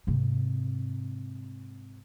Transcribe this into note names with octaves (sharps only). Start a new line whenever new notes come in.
G#2 C3